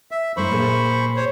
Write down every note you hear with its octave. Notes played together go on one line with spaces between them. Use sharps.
E5
F#2 A3 E4 C5 B5 C#6
A#2 G#4 E5
C5 C#5